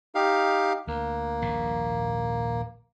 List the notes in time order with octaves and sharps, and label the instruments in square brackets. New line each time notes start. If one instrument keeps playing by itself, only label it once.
[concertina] D#4 G4 F5
[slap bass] D2 [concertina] A#3
[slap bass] D#1 A#1 G#2